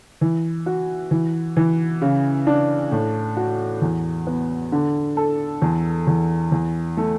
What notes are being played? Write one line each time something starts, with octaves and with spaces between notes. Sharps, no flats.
E3
F#4
E3
E3
C#3
D4
A2
F#4
E2
B3
D3
A4
E2
E2
E2
A3